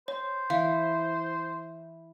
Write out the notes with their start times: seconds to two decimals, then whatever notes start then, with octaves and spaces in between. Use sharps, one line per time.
0.08 C5 C#5
0.50 E3 F5